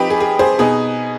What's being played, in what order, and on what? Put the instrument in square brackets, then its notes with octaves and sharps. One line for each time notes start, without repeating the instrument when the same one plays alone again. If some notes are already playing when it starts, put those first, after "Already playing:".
Already playing: [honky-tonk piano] F3 C4 D#4 G4 B4
G#4
G#4
G#4 C5
B2 B3 D#4 G#4